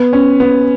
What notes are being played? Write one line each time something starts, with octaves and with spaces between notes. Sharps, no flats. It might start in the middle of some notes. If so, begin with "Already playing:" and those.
Already playing: B3
C#4
B3